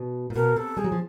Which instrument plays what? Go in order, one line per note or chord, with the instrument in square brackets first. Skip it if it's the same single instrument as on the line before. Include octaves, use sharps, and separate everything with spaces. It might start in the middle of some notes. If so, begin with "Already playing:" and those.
Already playing: [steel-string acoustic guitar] B2
A#2
[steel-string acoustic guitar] B2 [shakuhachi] A#4
[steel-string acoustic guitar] C3 [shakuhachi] A4
[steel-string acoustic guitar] G3 [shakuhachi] G#4
[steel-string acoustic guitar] F#3
F3